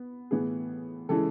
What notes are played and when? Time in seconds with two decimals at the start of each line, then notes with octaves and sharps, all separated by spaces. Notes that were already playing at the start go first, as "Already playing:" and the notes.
Already playing: B3
0.31 A2 E3 B3 G#4
1.09 C#3 E3 G#3 A4